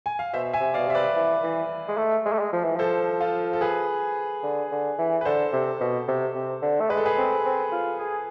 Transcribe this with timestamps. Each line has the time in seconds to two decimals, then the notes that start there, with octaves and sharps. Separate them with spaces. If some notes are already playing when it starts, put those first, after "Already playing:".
0.06 G#5
0.19 F5
0.33 B2 C5 E5
0.53 E5 G#5
0.60 C3
0.74 D5 F5
0.78 B2
0.88 C3 E5
0.95 B4 D5
1.16 E3
1.43 E3
1.88 G#3
1.97 A3
2.25 G#3
2.32 A3
2.39 G#3
2.53 F3
2.64 E3
2.76 F3 A4 C5
3.21 F4 A4
3.53 A4
3.61 G#4 B4
4.43 D3
4.72 D3
4.99 E3
5.21 B4
5.25 D3 A4 C5
5.53 C3
5.81 B2
6.08 C3
6.35 C3
6.62 D3
6.80 A3
6.90 G#3 B4
6.97 A4
7.05 G#4 B4
7.18 C4
7.45 C4
7.72 F4
7.99 G#4